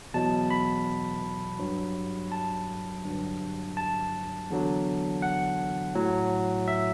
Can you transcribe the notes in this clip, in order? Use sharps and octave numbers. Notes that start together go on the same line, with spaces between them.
E2 B2 F#3 A5
B5
G2 F#3
A5
G2 D3 F#3
A5
E2 D3 F#3
F#5
A2 F#3
E5